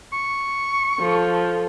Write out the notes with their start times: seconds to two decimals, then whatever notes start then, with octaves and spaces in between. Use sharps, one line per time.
0.13 C#6
1.00 F3 A4